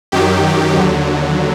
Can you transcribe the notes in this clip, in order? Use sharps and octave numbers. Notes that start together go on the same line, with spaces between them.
F#2 D#3 F#3 G4
D#2 D3 F#3